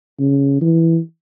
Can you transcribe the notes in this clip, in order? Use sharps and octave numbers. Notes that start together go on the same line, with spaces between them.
C#3
E3